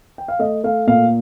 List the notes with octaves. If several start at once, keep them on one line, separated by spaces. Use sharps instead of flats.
G5
F5
A3 D#5
A3 F5
A#2 F5